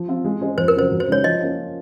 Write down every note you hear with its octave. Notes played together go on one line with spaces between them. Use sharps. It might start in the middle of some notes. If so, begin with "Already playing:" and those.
Already playing: F3
C4 F4
G#3
C#4 G#4 C5 D#5
F2 C5
A#4
C#3 F#3 C5
F#2
C5
C#3 G#3 D#4 C#5
F3 D#5
A#3 C#4 F4